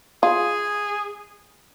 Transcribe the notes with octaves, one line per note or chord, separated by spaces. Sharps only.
F4 G#4